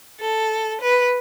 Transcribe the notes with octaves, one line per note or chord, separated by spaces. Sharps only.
A4
B4